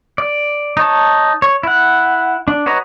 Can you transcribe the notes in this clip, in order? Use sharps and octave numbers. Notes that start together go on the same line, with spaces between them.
D5
D#4 C#5 A5
C#5
E4 F#5
D4
F#4 B4 C#5 D#5 A#5